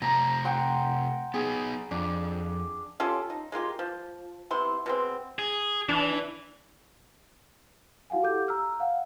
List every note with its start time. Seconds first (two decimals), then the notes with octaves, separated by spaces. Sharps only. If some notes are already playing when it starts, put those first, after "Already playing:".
0.02 C3 A3 A5 A#5
0.45 F#5 G5 C6
1.34 B3 D#4 G#4
1.91 F2 D4
3.00 C#4 F4 G4 A4
3.30 D#4
3.52 G#3 A#3 F4 G4
3.79 F3
4.50 C3 B3 E4 C6
4.86 B2 G#3 C4
5.39 G#4
5.89 E3 D4
8.10 E4 F#4 F5 F#5 G#5
8.22 G4 A4 D6 G6
8.48 A#5 E6 F6
8.80 F5 F#5